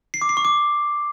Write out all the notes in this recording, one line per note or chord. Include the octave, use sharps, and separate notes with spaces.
C7
D6
C7
C#6
D6